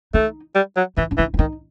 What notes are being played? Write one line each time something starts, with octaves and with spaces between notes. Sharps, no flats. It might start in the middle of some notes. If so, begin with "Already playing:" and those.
A3 D#4
G3
F#3
E3 E4
D4
E3 D#4
E4
D#3 D#4